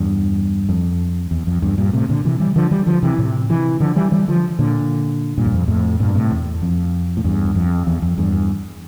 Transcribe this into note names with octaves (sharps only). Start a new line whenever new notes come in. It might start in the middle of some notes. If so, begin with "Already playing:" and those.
Already playing: E2 G2
F2
E2
F2
E2 G2
G2 A#2
A2 C3
A#2 D3
C3 E3
E3 G3
D3 F3
E3 G3
D3 F3
C3 E3
A2 C3
C3 E3
D3 F3
E3 G3
E3 G3
D3 F3
A#2 D3
G2 A#2
E2
F2
F2 A2
G2 A#2
A2 C3
E2
F2
A2
E2 G2
F2
E2
F2
E2 G2